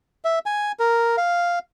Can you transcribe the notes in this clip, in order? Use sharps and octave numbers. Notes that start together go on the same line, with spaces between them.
E5
G#5
A#4
F5